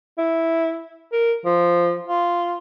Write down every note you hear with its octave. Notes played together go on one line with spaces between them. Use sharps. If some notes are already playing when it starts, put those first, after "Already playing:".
E4
A#4
F3
F4